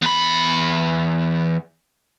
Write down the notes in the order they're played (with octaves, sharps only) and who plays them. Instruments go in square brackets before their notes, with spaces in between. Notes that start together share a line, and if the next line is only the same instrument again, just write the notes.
[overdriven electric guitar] E2 B5